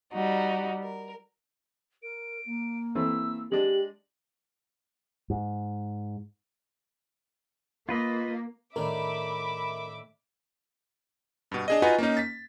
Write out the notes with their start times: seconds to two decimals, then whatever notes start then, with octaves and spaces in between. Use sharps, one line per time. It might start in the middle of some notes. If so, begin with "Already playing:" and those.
0.12 G3 D#4 F#4
0.82 A#4
2.03 A#4 D7
2.46 A#3
2.95 E3 A3 C4 E6
3.52 G#3 D4 G4 F#7
5.30 G#2
7.89 A#3 F4 B4 D#5
8.76 A2 D#3 D4 A#4 E5 B5 D6
11.51 G2 B2
11.68 D4 G#4 D#5
11.82 D#4 F4 F#4 B4 D#5 G#5
11.98 A#3 C#4 D#4
12.17 A6 B6